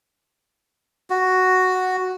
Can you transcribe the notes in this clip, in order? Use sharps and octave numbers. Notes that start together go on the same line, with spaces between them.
F#4